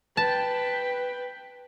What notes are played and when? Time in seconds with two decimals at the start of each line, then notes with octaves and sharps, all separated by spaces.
0.17 B4 G5 A5